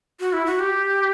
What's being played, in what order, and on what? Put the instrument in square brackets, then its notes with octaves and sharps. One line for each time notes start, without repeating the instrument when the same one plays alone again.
[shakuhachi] F#4
E4
F#4
G4